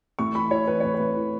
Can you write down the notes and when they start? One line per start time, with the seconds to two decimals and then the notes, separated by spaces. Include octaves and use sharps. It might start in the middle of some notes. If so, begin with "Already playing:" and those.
0.19 A2 C#6
0.35 E3 B5
0.51 E3 C#5
0.67 E3 B4
0.80 A2 C#5
0.94 B4
0.99 A2
1.16 E3